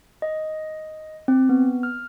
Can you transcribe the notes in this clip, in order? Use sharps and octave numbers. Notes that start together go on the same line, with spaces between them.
D#5
C4
B3
F6